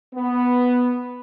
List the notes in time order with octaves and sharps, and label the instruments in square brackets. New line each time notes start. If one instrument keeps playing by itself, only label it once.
[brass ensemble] B3